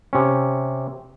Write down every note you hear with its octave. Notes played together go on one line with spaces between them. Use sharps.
C3 C#4